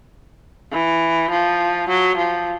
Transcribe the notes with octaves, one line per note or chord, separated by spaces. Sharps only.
E3
F3
F#3
F3